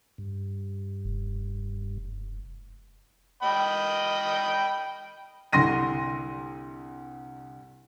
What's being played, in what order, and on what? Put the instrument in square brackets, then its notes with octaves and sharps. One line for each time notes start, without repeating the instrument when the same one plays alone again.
[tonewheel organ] G2
[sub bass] F1
[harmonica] D#5 G5 B5
[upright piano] C2 D3 C6 A#6 D#7